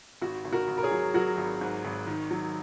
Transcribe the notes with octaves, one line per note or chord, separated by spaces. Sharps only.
G#1 F#4
G#1
F#4 A#4
G#1
A#4
G#4 C#5
F#3
F#3 F#4 A#4
G#1
G#2
G#1
D#3
F#3